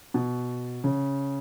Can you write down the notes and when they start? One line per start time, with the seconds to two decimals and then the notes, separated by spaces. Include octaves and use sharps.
0.14 B2
0.84 C#3